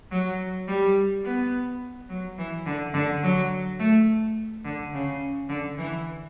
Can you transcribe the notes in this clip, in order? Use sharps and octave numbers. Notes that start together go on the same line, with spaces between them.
F#3
G3
B3
F#3
E3
D3
D3
F#3
A3
D3
C#3
D3
E3